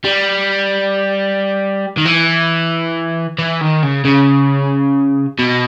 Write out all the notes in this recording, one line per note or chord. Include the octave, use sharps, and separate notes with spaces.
G3
D#3
E3
E3
D#3
C#3
C#3
B2